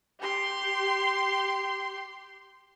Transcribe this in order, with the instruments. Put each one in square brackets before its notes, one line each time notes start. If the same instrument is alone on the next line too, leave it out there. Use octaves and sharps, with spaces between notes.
[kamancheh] G4 C6